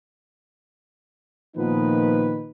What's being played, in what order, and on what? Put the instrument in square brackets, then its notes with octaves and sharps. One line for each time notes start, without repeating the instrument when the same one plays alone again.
[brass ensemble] A#2 D#3 F3 B3 D#4 B4